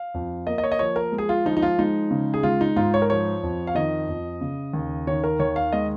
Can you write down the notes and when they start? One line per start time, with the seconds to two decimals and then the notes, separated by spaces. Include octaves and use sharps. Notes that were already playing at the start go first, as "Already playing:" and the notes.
Already playing: F5
0.14 F2
0.47 A#3 D#5
0.58 D#5
0.63 C#5
0.72 D#5
0.79 F3 C#5
0.96 A#4
1.12 G#3
1.18 G#4
1.29 F4
1.45 F3 D#4
1.57 D#4
1.62 F4
1.78 G#3 D#4
2.11 C#3
2.34 G#4
2.43 G#3 F4
2.61 D#4
2.76 G#2 F4
2.94 C#5
3.02 A#4
3.10 F3 C#5
3.43 F2
3.67 F5
3.75 D#3 D#5
4.09 F2
4.41 C#3
4.74 D#2
5.07 D#3 C#5
5.24 A#4
5.40 D#2 C#5
5.56 F5
5.72 G#3 D#5